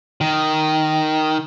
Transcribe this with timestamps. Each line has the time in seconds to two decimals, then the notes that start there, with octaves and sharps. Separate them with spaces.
0.21 D#3